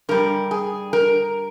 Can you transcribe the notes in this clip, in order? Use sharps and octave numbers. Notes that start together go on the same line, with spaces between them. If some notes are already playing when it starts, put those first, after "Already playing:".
G2 G3 A#4
G#4
A#4